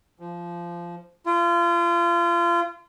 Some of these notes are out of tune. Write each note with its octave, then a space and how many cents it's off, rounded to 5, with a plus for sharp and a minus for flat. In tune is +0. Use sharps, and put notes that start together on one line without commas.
F3 -15
F4 -30